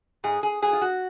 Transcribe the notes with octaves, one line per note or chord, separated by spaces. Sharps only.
G#2 G#4
G#4
F#3 G#4
F4
F#4